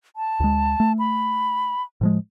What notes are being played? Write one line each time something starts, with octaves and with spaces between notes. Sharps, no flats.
A5
D2 G#3
A3
B5
A2 F3 G#3